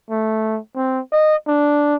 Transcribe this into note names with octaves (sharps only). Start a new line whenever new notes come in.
A3
C4
D#5
D4